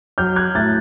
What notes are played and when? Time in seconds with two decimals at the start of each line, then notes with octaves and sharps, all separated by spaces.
0.18 F#3 F6 G6
0.36 F#6 G#6
0.55 A2 G6 A6